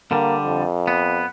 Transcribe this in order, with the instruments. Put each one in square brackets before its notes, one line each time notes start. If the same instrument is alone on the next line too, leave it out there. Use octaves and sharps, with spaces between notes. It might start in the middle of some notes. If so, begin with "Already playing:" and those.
[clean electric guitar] D3 G3 [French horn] A#3
[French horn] F2
[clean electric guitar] B3